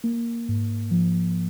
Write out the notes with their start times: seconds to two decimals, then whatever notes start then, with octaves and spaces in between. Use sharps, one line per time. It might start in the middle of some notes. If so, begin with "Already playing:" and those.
0.04 A#3
0.48 G#2
0.91 F3